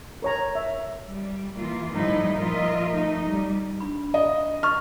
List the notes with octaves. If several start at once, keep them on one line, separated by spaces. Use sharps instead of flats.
A#4 C#5 A#5
E5
G3
E3 A#3 F4
A2 D#3 F3 G3 D#4 E4
A#2 F3 F4 A#4 D#5 E5
A3 D#4
G3
D4 B5
D#5
D#5 C#6 F6